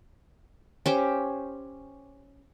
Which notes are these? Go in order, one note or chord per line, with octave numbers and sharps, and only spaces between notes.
C#4 G4 C5